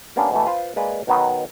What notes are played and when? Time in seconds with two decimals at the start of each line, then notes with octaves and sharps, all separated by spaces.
0.16 G3 A#3 B3 C#4 D4
0.32 B2 E3 A3
0.46 F4 B4 C5
0.76 G#3 A#3 G#4 B4 D5
1.07 B2 D#3 F#3 B3